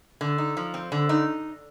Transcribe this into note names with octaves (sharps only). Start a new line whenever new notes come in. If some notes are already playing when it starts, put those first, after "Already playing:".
D3
D#4
F3
C4
D3
D#4